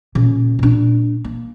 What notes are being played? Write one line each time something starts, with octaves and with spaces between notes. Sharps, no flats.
A#2 C#3
A#2 D4
A#3